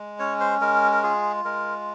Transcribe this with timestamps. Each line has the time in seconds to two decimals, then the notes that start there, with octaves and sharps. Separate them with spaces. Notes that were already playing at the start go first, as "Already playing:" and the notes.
Already playing: G#3
0.19 C#4 C#5
0.40 C5
0.61 G#3 A#4
0.92 A#4
1.03 F4 G#4
1.45 G#3 A#4